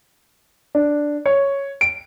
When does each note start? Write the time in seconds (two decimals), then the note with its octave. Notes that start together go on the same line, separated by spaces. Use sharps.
0.75 D4
1.26 C#5
1.81 D7